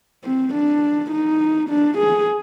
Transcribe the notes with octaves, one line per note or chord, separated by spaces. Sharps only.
C4
D4
D#4
D4
G#4